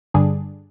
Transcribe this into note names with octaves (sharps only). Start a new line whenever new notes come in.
G2 D3 G3 D4 G#4